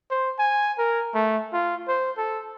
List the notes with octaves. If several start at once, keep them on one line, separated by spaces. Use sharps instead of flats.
C5
G#5
A#4
A3
F4
C5
A4